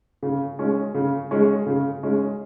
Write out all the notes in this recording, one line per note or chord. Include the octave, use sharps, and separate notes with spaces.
C#3
G#3 C#4
C#3
G#3 C#4
C#3
G#3 C#4